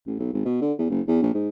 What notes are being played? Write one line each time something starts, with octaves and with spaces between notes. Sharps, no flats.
A1
B1
G#1
B2
D3
E2
F#1
E2
A#1
G#2